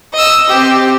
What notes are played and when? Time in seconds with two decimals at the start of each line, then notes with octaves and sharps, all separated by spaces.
0.14 D#5 E6
0.49 C4 G4